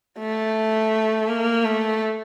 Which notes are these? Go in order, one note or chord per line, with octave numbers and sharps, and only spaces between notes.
A3
A#3
A3